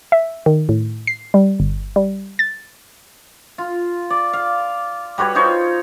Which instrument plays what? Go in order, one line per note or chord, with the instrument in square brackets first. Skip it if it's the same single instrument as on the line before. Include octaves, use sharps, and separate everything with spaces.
[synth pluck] E5
D#3
A2
C7
G3
G1
G3
A6
[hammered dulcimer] F4
D5
F5
G3 F#4 B4 C#5
D#4 F4 C5 C#5